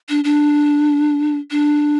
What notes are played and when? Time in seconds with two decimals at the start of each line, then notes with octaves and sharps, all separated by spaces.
0.09 D4
0.24 D4
1.51 D4